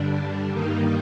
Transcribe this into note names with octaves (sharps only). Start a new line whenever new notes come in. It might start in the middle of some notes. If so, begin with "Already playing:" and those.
Already playing: G2 D3 G3 D4
G2 D#3 G3 A#3 D#4